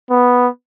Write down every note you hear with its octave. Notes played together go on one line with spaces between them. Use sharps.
B3